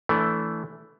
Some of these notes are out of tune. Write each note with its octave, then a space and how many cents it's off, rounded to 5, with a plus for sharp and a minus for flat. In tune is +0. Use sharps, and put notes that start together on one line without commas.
E3 -5 A3 +0 D4 -30